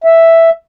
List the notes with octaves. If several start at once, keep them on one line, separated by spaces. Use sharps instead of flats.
E5